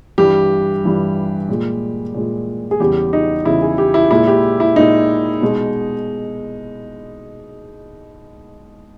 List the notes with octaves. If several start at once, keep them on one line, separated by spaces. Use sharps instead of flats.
G2 E3 G3 G4
G2 E3 G3
A#2 G#3
A#2 G#3
G#4
E2 C#3 G3 G4
D#4
E2 C#3 G3 E4
G#4
G4
E4
A#2 G#3 E4
G4
E4
A#2 G#3 D#4
B2 G#3